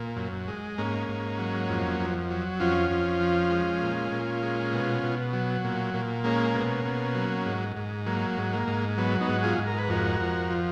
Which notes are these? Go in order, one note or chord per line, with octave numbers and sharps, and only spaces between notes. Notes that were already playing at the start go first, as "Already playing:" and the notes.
Already playing: A#2
F#2
G#3
G#2 A#3 C#4
G#2
F#3
F2
F2
F#3
F2 C#4 F4
F2
F3
G#3
A#2
A#2
G#3
B2
B2
F#3
A#2
A#2
G#3 A#3 C#4
B2
B2
F#3
G#2
G#2
F#3 A#3
G#2
A#3
G#2
F#3 B3
B3 D#4
G#2
F4 G#4
G#2
A#4
B4
F2 F#4 A#4
F2
F3